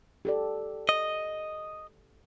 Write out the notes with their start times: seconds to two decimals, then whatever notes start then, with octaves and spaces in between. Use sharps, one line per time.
0.25 G4 A4 D5
0.89 D#5